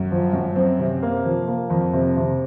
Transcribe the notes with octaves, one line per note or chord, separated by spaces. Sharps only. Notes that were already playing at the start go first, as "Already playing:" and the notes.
Already playing: F#2
F3
F#2
C4
C3
A#3
F3
A#3
F2
C3
C3